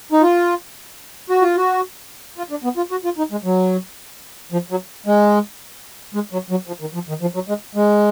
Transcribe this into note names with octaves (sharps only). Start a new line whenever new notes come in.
D#4
F4
F#4
F4
F#4
F4
D4
B3
F4
F#4
F4
D#4
G#3
F#3
F3
F#3
G#3
G#3
F#3
F#3
F3
D#3
F3
D#3
F3
F#3
G#3
G#3